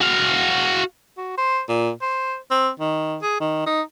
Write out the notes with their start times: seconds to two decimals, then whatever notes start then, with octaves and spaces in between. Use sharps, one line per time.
0.01 F#4 F5
1.18 F#4
1.38 C5
1.69 A#2
2.02 C5
2.51 C4
2.80 D#3
3.22 G#4
3.41 D#3
3.66 D#4